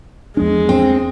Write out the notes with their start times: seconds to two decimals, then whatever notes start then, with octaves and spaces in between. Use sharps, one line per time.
0.37 E2 F3 G#3 D4
0.69 C4